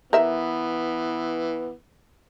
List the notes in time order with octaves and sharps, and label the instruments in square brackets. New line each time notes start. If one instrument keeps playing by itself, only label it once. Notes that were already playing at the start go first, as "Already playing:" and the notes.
[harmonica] E3 [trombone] B3 [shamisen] A#4 E5